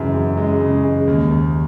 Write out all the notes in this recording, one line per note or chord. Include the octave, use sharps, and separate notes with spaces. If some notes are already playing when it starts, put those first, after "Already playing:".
Already playing: F#2 C#3 E3 G#3
F#2
G#3
C#3
G#3
D#2
D#2